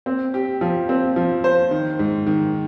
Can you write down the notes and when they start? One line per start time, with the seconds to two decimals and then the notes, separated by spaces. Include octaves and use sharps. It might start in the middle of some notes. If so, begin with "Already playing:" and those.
0.06 C4
0.34 G4
0.61 F3
0.89 C4
1.16 F3
1.44 C5
1.71 D#3
1.99 G#2
2.27 D#3